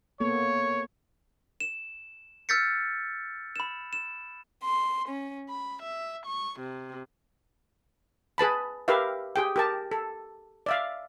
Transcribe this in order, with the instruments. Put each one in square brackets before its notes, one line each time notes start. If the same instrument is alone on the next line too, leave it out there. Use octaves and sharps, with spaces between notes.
[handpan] A#3 B3 A4 [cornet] C#5
[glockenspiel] E7
E6 F6 G6 A6 B6 C#7
B5 E7
E7
[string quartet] C6
C#4
B5
E5
C#6
C3
[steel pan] G#4 B4 A5 B5
G4 A#4 B4 E5 F5
G4 G#4 G5
G4 A#4 A5
A4
D5 E5 F5